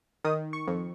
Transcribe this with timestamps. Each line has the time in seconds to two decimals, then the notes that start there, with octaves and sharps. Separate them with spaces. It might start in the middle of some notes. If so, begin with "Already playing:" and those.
0.24 D#3 D#6
0.53 C#6
0.67 F2